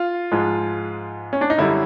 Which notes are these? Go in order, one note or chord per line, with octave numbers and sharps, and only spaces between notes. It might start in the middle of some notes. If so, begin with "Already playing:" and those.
Already playing: F4
G#2 F3 G#3
C#4
D4
D#4
F#2 D3 G3 E4